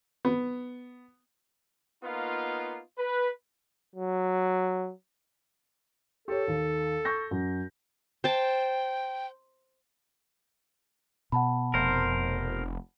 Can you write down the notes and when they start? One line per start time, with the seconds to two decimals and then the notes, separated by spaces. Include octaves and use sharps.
0.25 B3
2.04 A#3 B3 D#4 F4
2.98 B4
3.96 F#3
6.28 G4 A4 C#5
6.48 D#2
7.05 C#6 G6 A#6
7.31 F#2
8.24 C5 G5 A5
11.32 B2 F#5 A5 B5
11.74 F1 A#4 C5